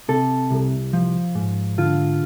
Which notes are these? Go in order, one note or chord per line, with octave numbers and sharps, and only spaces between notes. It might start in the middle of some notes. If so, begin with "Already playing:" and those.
C3 A4
C2
F3
G#2
D3 F4